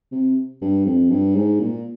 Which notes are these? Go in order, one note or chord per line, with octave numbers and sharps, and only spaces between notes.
C3
G2
F2
G2
G#2
A#2